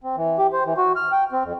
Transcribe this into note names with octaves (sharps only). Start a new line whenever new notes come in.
C4
E3
G4
C5
E3
F#4
F6
G5
C4
F2